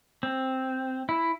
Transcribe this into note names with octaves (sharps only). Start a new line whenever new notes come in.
C4
E4